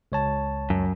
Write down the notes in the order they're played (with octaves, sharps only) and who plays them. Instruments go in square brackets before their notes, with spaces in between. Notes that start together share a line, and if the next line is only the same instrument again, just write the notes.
[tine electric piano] C#2 C#5 A5
[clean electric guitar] F#2